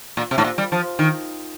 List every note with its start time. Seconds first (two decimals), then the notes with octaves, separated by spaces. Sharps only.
0.17 A#2
0.31 C3
0.38 A2
0.44 A#2
0.58 G3
0.72 F3
0.99 D#3